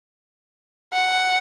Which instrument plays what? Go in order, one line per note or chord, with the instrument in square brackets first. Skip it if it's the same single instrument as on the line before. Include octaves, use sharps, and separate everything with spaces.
[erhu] F#5